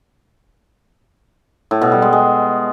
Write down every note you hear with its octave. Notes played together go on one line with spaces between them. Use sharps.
A2
B2
G3
G#3
G#3